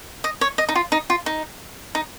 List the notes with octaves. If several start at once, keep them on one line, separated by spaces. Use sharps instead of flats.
D#5
C#5
D#5
D#4
F4
D#4
F4
D#4
D#4